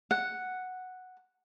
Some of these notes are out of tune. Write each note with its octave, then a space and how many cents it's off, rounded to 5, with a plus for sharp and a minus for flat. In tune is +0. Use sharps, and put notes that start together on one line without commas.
F#5 +0